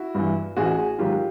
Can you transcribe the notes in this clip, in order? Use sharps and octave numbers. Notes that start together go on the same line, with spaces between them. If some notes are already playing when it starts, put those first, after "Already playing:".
Already playing: E4 F#4
G2 E3
A1 F#4 G#4
G#2 D#3 F#3 F4 G4